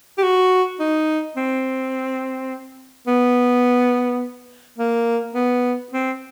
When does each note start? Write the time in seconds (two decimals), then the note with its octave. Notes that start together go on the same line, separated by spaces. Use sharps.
0.18 G4
0.23 F#4
0.80 D#4
1.36 C4
3.07 B3
4.78 A#3
5.34 B3
5.92 C4